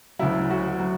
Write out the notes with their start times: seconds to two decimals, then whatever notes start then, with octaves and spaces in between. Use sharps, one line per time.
0.19 D2 C#3 F#3 E4
0.50 F#4
0.79 F#3